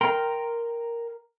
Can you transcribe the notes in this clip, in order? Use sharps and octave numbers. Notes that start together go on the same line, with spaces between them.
A#4 G5 A#5 C6